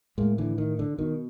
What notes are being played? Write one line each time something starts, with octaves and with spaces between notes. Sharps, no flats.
A2 G#3 A#3
D3 E3
D#3
D3
B2 D#3